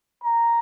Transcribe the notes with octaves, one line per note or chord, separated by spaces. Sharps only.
A#5